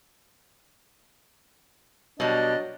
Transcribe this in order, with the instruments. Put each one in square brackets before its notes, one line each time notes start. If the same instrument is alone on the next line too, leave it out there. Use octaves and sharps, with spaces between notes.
[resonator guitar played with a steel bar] B2 G3 [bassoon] F#3 [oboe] D4 [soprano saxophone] D#5